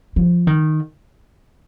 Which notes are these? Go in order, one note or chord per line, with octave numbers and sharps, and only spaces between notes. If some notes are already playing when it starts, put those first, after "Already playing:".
F3
D#3